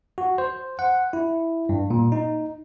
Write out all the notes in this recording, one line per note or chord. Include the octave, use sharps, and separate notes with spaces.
F#4
C5
F#5
E4
G2
A#2
D#4